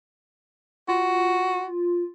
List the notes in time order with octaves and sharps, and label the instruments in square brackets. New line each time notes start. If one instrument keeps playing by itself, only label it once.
[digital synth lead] F4 [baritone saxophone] F#4